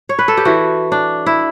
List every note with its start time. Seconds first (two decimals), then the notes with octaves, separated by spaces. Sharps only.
0.09 C#5
0.19 B4
0.28 A4
0.37 G4
0.45 E3 F#4
0.92 D4
1.26 E4